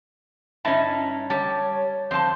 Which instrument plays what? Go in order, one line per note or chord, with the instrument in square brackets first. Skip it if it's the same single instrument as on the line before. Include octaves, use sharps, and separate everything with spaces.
[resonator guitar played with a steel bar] G2 C#4 [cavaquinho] D#4 E4 A5
[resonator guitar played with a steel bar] G3 [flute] C#5 [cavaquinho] A5
[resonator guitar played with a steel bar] F2 A5 [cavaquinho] C5 C6 [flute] G6